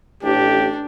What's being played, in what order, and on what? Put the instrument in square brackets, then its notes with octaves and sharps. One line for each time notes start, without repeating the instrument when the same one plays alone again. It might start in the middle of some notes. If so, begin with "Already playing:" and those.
[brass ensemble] A1 [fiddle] D4 [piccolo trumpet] G4